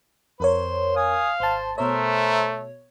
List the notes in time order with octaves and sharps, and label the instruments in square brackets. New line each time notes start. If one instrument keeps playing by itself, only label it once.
[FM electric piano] F2 A#4 C#5 [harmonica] C5
[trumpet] F5 [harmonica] G#5 D#6
[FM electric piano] G#1 A5 [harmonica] C5
[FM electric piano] B2 C#5 [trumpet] A3 [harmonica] A#4 C5 E5